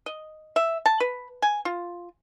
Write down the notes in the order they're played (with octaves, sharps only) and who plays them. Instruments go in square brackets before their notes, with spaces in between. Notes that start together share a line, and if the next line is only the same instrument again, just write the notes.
[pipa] D#5
E5
A5
B4
G#5
F4